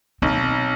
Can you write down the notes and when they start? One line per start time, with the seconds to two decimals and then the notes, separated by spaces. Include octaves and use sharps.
0.22 B1 C4